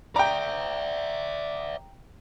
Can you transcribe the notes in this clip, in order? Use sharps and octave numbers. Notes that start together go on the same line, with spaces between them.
D5 E5 G5 A#5